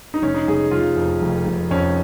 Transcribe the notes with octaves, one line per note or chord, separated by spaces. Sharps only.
D#4
F1 C#4
D#4
F1 G#4
F1 F4
F2
F1
F1
F2 C#4